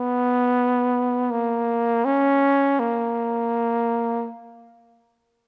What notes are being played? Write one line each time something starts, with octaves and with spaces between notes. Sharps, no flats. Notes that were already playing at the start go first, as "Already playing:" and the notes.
Already playing: B3
A#3
C#4
A#3